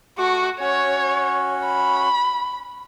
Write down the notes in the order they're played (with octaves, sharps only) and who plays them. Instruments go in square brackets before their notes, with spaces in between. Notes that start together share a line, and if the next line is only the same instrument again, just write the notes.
[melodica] A3 C#6 D6 [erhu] F#4
[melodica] C#4 F#4 [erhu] C#5
[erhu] B5